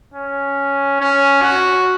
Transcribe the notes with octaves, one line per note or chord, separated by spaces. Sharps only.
C#4
C#4
F#4